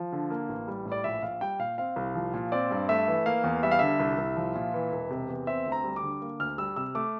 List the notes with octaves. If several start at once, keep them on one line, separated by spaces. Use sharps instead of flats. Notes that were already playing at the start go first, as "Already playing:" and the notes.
Already playing: F3
D3
A#3
A1
G3
A2
D5
A#1 E5
A#1 F5
G3 G5
A#2 F5
C4 F5
C2
F3
A#2
C4 D5
G2
A3 E5
E3
A#3 F5
E2
G3 E5
F5
D3 E5
C2
C2
F3
A#2
E3
E1
C3
E2
C4 E5
D2
A#5
G3
D6
D3
A#3
D2 F6
G3 E6
C3 E6
A3 D6